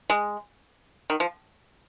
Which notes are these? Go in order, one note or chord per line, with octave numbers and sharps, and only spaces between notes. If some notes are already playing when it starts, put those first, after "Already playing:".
G#3
D#3
F3